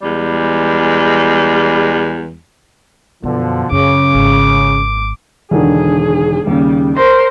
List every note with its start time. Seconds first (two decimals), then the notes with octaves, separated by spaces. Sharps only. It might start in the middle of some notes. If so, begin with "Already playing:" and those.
0.01 E2 G3 G#3
3.23 F#2 B2 D3 F3
3.71 F#2 C#3 D6
4.14 G#1
5.51 E1 D3 D#3 G#4
6.47 D#2 C#3 G3
6.97 A#4 C5 A#6